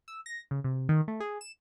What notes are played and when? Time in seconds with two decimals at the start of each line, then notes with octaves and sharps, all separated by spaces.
0.08 E6
0.26 A#6
0.51 C#3
0.64 C3
0.89 D#3
1.08 A3
1.20 G#4
1.41 E7